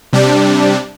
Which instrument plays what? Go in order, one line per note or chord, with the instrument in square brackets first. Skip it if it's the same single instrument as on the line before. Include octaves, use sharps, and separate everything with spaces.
[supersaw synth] C3 G3 D4